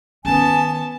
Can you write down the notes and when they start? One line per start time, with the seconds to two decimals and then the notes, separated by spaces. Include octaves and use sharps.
0.25 D#3 B3 C#4 G#5 A5